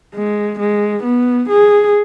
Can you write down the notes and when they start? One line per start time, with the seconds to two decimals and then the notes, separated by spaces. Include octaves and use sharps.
0.14 G#3
0.59 G#3
1.04 B3
1.49 G#4